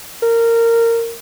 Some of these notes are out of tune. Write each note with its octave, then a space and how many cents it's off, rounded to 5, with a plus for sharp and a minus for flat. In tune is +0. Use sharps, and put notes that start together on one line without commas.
A#4 -15